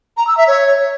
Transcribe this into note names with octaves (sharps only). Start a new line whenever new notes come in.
A#5
E6
E5
C#5